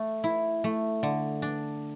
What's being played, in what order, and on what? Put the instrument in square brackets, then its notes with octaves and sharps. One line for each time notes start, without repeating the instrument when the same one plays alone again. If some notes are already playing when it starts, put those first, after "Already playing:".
Already playing: [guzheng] A3
E4
A3
D3
D4